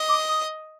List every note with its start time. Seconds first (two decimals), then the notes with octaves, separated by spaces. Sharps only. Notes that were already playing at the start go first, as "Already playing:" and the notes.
Already playing: D#5
0.08 D6
0.28 D#6